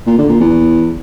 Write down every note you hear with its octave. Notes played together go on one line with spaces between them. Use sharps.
A#2
D3
A#2
E2